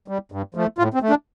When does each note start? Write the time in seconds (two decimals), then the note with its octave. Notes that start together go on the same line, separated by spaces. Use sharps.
0.08 G3
0.32 G2
0.55 F3 A3
0.78 A2 F4
0.94 C4
1.02 A3
1.10 D4